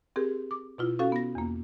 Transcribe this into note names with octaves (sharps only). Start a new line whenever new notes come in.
C4 G4 G#4 A#4
D6
B2 E4 F4
C#4 F#4 A4 F5
B3 A#6
E2 A#3